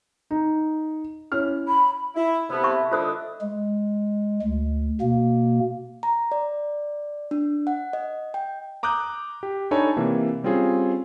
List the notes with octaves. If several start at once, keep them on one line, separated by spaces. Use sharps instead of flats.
D#4
C#4 E4 F6
B5
E4
C3 B3 E4 A4
E5 C#6
D3 F4 C5 D#5 D#6
G#3
D2
B2 A#3
A#5
D5
D4
F#5
D#5
G5
A#5 D6 D#6 F#6 G6
G4
D4 D#4 A4 C#5 G#5 B5
C3 E3 A#3
G3 C4 C#4 F4 G#4